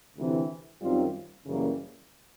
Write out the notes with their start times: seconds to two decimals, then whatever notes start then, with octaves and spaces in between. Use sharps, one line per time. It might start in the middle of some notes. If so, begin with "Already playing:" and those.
0.16 D2 C3 E3
0.81 F#2 D#3 G3 C4 F4
1.45 F#2 C#3 E3 G3 A#3